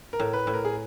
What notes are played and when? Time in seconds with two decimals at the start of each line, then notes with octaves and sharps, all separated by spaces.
0.13 A#4
0.20 A2
0.33 B4
0.47 A2
0.54 A#4
0.65 G#4